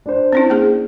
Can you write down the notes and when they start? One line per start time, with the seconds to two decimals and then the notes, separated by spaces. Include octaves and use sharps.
0.06 D4 C5
0.33 C4 C#4 E4
0.50 A#3 G#4